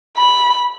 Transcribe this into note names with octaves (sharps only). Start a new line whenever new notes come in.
B5